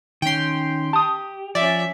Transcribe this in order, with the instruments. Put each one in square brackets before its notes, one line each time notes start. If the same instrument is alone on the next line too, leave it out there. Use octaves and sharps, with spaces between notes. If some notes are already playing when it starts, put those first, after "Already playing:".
[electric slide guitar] D#3 C#4 [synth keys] G5 C6
[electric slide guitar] G4 [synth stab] A5 D#6
[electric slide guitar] F3 [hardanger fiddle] C#4 E5 [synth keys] D5